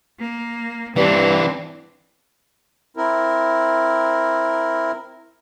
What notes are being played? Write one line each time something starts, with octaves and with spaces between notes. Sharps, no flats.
A#3
G2 E3 C4 D4 D5
C4 E4 A#4